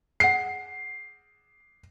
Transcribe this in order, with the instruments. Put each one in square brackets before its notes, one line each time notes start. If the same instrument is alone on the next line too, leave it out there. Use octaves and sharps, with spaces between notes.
[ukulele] G#4 F#5 [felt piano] C7